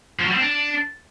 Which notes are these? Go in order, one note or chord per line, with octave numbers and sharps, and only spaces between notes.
F3
F#3
G3
C4
D4